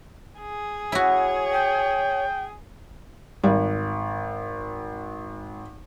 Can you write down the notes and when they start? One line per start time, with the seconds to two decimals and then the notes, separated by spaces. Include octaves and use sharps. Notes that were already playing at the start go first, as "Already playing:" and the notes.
0.40 G#4
0.92 E4 F#4 C#5
1.52 G5
3.44 G#1 G3